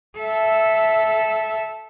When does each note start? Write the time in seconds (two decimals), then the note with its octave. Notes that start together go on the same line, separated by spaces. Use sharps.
0.19 A4 E5